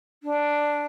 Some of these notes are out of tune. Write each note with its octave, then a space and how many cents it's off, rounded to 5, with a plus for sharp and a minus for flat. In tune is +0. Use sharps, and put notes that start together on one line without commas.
D4 +0